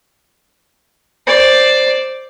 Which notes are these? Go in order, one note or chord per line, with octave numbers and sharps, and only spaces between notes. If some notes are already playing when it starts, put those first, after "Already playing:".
C5 D5